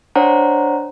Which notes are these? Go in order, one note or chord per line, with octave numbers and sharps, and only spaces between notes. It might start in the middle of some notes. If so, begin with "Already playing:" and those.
D4 C5 C#5 F#5 A#5